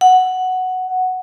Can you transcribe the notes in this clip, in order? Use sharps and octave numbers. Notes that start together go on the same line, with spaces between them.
F#5